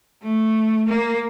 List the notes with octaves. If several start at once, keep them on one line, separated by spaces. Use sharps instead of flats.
A3
A#3